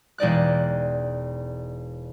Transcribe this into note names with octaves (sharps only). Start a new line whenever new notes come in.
E1 D#4 D5 F#6